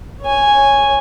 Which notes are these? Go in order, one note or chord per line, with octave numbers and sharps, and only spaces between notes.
C#5 G#5